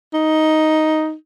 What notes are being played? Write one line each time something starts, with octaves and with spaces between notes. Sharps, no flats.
D#4